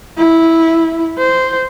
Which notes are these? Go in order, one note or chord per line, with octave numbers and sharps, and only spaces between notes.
E4
C5